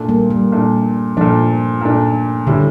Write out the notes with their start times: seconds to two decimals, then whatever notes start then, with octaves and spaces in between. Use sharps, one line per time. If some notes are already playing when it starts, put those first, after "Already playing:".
Already playing: A#2 A3 D4
0.09 G3 A#3
0.30 G3
0.52 A#2 A3 D4
1.17 A#2 F3 A3 D4
1.81 A#2 A3 D4
2.47 A2 D3 G3